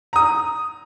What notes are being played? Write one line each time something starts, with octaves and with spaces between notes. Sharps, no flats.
A#5 D#6